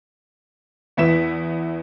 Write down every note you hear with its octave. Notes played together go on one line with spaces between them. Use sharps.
E2 B3 E4 B6 E7